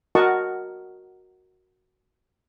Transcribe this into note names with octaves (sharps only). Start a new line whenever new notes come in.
F#4 A#4 D#5 F#5 A5 C#6